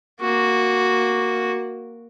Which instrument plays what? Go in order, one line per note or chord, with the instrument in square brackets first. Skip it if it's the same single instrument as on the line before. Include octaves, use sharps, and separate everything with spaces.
[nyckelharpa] A#3 F#4